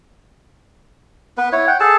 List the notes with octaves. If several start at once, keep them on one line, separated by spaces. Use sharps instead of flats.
B3 B4
E4 C#5
F#5 G5
G#4 A4 A5